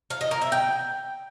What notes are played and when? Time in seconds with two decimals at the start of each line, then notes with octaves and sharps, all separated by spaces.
0.10 F5
0.21 D#5
0.31 A#4
0.42 E5
0.52 G5